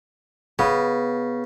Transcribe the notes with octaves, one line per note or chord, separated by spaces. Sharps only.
C#3 B3